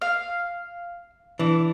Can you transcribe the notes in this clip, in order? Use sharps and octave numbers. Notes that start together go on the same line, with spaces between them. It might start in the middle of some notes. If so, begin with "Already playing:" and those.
F5
E3 D4